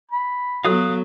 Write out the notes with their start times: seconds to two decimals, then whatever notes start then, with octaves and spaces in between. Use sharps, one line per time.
0.11 B5
0.65 F#3 B3 F#4 A4 F5 D#6 F#6